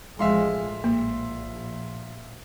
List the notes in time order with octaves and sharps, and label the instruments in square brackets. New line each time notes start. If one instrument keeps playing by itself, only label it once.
[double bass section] A1 F3 G#3 [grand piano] E5 F5 C6
[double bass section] A#1 [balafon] A#3